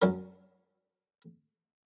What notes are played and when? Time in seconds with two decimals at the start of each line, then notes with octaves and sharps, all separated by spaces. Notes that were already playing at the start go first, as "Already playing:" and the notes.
0.02 F#2 F#3 C#4 A#4